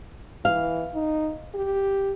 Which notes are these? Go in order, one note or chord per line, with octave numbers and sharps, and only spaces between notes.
E3 F5
D#4
G4